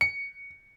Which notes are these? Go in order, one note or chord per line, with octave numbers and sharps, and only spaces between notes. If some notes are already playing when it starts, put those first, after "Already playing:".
C#7